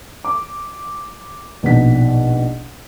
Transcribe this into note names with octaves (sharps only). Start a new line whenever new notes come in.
D6
A#1 B2 D#4 B6